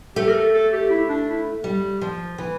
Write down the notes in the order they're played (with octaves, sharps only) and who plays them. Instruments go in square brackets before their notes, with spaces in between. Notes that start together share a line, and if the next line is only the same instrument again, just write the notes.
[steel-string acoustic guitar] A3 [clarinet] G4
[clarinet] A#4
A4
A4
G4
E4
D4
E4
[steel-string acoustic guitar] G3
F3
E3